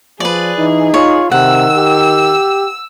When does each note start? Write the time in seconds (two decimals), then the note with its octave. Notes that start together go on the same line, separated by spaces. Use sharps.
0.20 F3 G#4 B4 D5
0.59 E3 D#4
0.94 F4 C#5
1.32 C3 D#3 F#5 E6
1.76 G4